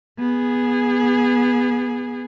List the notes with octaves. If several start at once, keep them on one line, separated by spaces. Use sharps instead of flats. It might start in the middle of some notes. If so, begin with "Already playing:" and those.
B3 G#4